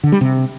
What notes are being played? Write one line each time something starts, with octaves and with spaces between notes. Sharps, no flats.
D3
G3
C3